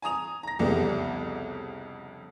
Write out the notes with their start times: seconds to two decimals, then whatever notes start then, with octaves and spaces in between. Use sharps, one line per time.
0.02 G#5 A#5 D#6 F7
0.43 A#5 A#6
0.59 C2 F2 C#3 B3 G4